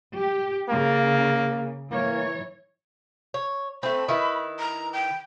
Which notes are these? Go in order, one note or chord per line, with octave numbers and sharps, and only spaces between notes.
G4
C#3 A#3
E3 A#3 C#5
C#5
A3 C4 B5
D#3 E4 B4
A#5
G5